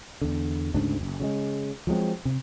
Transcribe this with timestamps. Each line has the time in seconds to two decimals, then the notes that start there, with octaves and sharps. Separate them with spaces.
0.21 E2 D3
0.74 D2 G#2 C#3 D4
1.01 F#1
1.20 C#3 F#3 G#3
1.87 F3 F#3 G#3 C4
2.25 C3